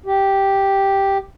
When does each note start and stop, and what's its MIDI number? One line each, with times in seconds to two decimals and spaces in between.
0.06 1.18 67